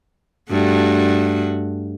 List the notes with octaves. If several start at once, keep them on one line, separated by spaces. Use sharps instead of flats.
G2 A3 F#4